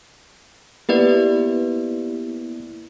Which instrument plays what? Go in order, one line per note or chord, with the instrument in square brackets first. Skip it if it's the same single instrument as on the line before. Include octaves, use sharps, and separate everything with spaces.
[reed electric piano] A#3 B3 E4 [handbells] G4 B4 D5